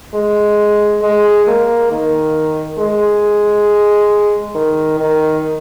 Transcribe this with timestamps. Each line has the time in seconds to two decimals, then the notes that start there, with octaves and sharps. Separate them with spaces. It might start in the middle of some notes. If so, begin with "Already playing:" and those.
0.14 G#3
1.02 G#3
1.47 A#3
1.91 D#3
2.78 G#3
4.55 D#3
5.00 D#3